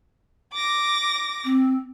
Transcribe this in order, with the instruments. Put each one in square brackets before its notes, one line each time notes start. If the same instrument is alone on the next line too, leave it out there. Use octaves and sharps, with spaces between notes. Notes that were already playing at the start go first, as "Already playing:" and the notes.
[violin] D6 A#6
[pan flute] C4